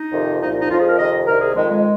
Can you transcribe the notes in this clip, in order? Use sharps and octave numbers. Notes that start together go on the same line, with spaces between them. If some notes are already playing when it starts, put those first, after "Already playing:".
Already playing: D#4
F2 C3 D#3
C2 A#2 F3 D#4
D#4
F2 F3 F4
G#4
A#4
F2 C3 D#3 D#5
C2 C3 D#3 A#4
G#4
F2 D#3 G#3
G#3